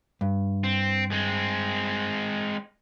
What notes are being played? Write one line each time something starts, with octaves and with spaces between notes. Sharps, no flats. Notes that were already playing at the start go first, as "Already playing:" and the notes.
G2
C4
G#3 C4